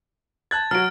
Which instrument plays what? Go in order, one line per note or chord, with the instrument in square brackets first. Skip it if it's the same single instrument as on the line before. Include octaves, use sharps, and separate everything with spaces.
[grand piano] A5 F#6 G#6 [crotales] A6
[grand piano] F#3 F#4 [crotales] F6 D7